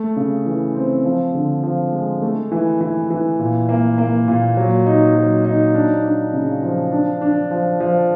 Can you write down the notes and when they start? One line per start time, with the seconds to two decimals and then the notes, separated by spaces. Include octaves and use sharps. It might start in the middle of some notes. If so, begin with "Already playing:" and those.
Already playing: A3
0.17 C#3
0.46 E3
0.75 C4
1.05 F3
1.34 D3
1.63 F3
1.93 G#3
2.22 A3
2.52 E3
2.81 E3
3.10 E3
3.39 A#2
3.69 A#3
3.98 A#3
4.28 A#2
4.57 F#3
4.86 D#4
5.15 F#3
5.45 D#4
5.74 D4
6.04 D4
6.34 C#3
6.63 F3
6.92 D4
7.21 D4
7.51 F3
7.80 F3